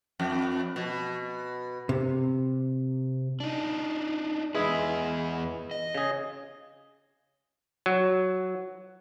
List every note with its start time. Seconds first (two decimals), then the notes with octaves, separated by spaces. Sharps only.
0.20 F2
0.76 B2
1.89 C3
3.40 D4 D#4
4.55 E2 A#2 G#3 E4 G#4 B4
5.71 D#5
5.95 C#3 G#4
7.86 F#3